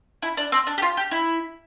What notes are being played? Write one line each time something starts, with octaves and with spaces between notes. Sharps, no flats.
E4
D4
C4
D4
G4
F4
G4
E4